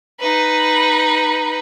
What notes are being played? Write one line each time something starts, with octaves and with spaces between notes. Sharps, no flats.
D#4 B4